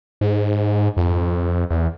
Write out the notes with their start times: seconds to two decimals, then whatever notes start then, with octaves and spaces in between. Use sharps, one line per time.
0.21 G#2
0.97 F2
1.70 E2